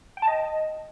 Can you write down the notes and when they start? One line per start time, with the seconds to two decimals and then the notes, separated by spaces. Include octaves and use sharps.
0.17 G5
0.22 A5
0.28 D#5